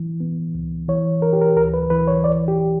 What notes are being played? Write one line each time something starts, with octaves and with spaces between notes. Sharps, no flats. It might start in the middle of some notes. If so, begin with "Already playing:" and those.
Already playing: E3
B3
C#2
E3 C#5
E3 A#4
G4
A#4
D2 A#4
B4
E3 B4
C#5
E3 D5
G4